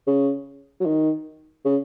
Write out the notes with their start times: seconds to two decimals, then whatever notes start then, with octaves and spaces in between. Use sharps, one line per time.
0.07 C#3
0.80 F#3
0.86 D#3
1.65 C#3